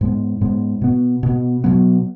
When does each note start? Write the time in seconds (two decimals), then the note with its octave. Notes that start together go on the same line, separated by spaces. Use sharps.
0.01 G#2 G#3 B3
0.41 G#2 G#3 B3
0.81 B2 B3
1.23 B2 B3
1.64 B2 F#3 B3